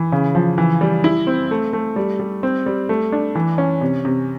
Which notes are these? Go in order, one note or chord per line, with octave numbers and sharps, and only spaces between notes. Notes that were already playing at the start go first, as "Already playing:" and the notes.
Already playing: E3
C#3
F3
E3
G3
E4
C4
A3
A3
G3
G3
C4
G3
A3
D4
E3
C#4
C3
C3